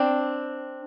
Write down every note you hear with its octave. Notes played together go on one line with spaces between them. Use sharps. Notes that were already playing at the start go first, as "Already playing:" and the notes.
Already playing: C4 D4